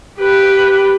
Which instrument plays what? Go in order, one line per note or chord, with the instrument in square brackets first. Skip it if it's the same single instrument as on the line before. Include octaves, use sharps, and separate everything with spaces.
[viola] G4 B4